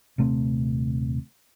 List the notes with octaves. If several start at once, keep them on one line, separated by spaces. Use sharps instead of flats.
D#1 C3 A3 C4